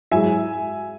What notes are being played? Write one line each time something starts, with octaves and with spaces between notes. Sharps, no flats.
G#2 F#3 E4 G#4 E5 G#5